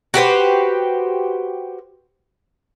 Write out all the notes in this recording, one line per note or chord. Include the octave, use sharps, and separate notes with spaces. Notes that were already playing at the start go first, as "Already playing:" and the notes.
F#4 G4 B4 C5